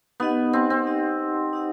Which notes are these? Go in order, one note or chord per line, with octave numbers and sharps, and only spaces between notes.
B3 D#4 G4 D#5 F#5
C4
C4
D#4 G4 D#5 F#5
D#4 G4 D#5 F#5